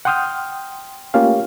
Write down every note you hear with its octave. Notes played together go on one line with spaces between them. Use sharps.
F#5 G5 C6 D#6 F6 G6
A3 A#3 C#4 F4 G4 F5